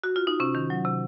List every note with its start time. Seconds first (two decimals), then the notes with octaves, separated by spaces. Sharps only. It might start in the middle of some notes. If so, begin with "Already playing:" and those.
0.04 F#4
0.16 F4
0.27 D#4
0.40 C3 C#4
0.55 D#3
0.70 F#3
0.85 C3